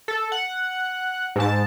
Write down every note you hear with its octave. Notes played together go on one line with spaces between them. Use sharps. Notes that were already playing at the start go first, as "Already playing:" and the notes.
A4
F#5
G#2 A5